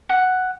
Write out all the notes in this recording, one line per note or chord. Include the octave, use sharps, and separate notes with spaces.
F#5